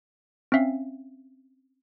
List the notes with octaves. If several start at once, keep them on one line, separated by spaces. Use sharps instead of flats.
C4 C#4 E5 F5